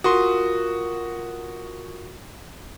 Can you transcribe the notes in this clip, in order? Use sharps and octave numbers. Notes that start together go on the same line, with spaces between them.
F4 F#4 A#4 C6 D#6